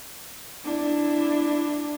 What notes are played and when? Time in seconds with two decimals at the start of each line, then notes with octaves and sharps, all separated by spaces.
0.65 D4 E4